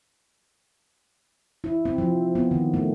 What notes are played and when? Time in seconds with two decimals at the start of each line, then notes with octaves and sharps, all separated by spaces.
1.64 E4
1.85 C4
1.98 F3
2.35 B3
2.51 D#3
2.74 A3